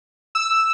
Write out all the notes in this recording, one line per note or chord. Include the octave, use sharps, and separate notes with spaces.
E6